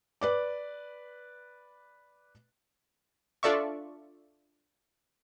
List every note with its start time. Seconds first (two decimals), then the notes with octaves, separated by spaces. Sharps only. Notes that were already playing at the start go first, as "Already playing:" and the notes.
0.21 B4 D5 D6
3.43 D4 F4 A4 D5 E5 C#6